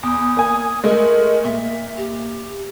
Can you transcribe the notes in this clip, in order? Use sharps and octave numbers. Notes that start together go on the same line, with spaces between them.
E2 D#6
A#3 G#5
G#3 A3 A#4
A#2 E5
G4